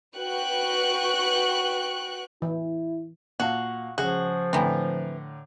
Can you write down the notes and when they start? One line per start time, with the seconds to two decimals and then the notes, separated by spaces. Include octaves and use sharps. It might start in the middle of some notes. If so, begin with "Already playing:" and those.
0.18 F#4 B4 G5 C#6 F#6
2.42 E3 E4
3.40 A#2 F#4 F5 A5
3.98 C#2 F3 F#4 G#4
4.53 A2 D3 E3 C4 A#5